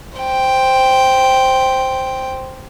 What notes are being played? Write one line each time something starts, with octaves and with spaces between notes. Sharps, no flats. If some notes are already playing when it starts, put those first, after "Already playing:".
C5 G5